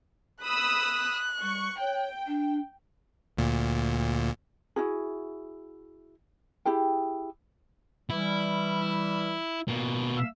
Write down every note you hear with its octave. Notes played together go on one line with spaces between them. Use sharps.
B5 D#6 E6 F#6
G3 C#6
C#5 G5
D4
D2 A#2
E4 F#4 G#4
E4 G4 G#4 G5
E3 G3 E4
B2 A#3
E5 F5 E6